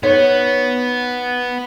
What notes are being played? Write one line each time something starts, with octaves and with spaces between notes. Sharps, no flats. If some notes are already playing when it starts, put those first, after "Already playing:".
B3 D#4 C#5